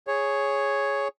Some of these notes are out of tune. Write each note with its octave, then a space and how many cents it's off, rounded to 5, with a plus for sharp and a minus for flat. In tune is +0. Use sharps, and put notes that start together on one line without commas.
G#4 +0 C#5 +0